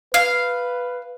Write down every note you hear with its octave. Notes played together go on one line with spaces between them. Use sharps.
B4 F5